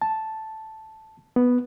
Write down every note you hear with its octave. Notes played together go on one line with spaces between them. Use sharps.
A5
B3